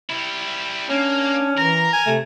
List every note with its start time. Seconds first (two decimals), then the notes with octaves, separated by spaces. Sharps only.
0.10 G3 E4
0.90 A#3 C#4 D4
1.58 E3 A#4 A#5
1.93 G#5
2.07 C3 A3